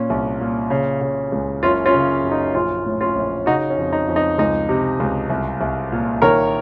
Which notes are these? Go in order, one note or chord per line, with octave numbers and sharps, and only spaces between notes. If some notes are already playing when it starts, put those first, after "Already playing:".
Already playing: A#2 C#4
C2
A#2
C#3
C#3
C#2
F#1 C#4 F4
C#4 F4
C#3
F#2
D#4
A#1 C#4 F4
A2
C#4 F4
A#1
C#3 D#4 F#4
C#4
F2
D#4
F2
D#4
C#2 D#4
C3
C#2
C2
C2
A#2
D#3 A#4 C#5